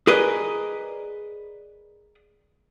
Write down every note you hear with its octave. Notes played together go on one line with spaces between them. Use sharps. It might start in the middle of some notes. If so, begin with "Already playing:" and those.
G#4 A#4 B4 D5 D#5